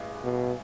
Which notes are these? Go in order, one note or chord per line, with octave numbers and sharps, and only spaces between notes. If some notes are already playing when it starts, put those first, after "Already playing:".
Already playing: A1 G2 E3 G#3
B2